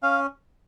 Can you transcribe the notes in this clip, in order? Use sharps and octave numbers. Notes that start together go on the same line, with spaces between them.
C#4 F5